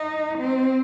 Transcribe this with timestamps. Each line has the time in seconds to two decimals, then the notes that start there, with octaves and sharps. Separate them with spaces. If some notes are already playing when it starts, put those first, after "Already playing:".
Already playing: D#4
0.38 C4